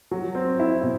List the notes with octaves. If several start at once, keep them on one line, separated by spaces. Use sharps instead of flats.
F#3
C4
E4
B2